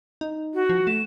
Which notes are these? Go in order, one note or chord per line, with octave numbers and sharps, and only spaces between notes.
D#4
F#4
F3
A3 E7